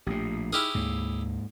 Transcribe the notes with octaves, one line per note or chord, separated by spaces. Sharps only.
A#1 A2 A3 G4
D#4 E4 G4 G#4 F6
D2 G#2 A#3